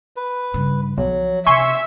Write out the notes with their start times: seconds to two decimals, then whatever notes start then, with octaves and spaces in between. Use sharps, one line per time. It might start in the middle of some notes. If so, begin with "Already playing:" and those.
0.16 B4
0.54 G2 C#3
0.98 B1 F3 F#3
1.47 C3 E5 G#5 C6 C#6 E6